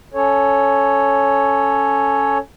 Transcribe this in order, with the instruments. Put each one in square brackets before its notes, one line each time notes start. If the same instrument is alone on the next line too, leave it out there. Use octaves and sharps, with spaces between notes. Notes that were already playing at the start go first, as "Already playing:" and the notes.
[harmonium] C#4 A4 C#5